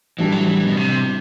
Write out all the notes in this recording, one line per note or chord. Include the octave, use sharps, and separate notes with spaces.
A2 E3 G3 D4 G4
F#3
E3
B2
C3